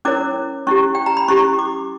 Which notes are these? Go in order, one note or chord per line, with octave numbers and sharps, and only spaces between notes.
C#4 E4 A#4 C#5 D6
C#4 E4 G4 C#6
G5
A#5
B5
C#4 E4 G4 C#6
D6